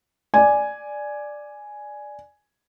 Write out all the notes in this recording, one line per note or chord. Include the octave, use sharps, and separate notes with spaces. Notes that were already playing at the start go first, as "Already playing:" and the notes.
D5 G#5